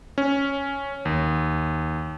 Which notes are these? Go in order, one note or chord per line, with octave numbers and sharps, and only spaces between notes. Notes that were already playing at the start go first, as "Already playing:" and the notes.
C#4
D#2